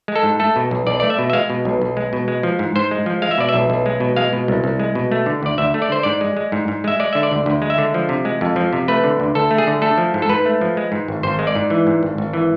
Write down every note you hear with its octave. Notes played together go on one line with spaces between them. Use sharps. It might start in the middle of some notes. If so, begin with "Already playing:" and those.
G#3
A4
G#2
A3 A4
B2
B1
B1 D5
A3 D5
E5
B2
E5
G#3 F5
B2
B1
B1
G#3
B2
G#3
F3
G#2
G#2 C5
G#3
F3
G#3 F5
E5
B2 D5
E5
B1
B1
G#3
B2
G#3 F5
B2
C2
C2
G#3
B2
A3
D3
D2 D5
D2 E5
A3
D5
D3 C5
G#2 D5
G#3
G#3
G#2
G#2
G#3 E5
G#3 D5
D3 E5
D5
D2
D2
G#3
E5
D3
F3
C3
G#3
F2
F3
C3
A3 B4
D3
D2
D2 A4
A3
G#4
D3
A3 A4
F3
G#2
A4
G#2 B4
A3
F3
G#3
G#2
G#1
G#1 C5
G#3
D5
G#2
E3
G#2
G#1
G#1
E3